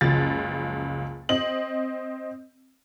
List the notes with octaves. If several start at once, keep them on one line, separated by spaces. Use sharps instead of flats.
F#1 C#2 F3 A6
C4 D#5 F#7